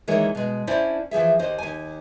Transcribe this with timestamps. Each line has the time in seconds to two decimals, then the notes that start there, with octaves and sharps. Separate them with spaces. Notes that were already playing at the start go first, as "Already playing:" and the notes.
0.07 D#3 E3 G#3 A#3 A#4 C#5
0.35 B2 G#3
0.67 C#4 D4 E4 C5 D5
1.11 E3 F3 G#4 E5
1.39 D#2 C5 D#5
1.58 D#2 G#5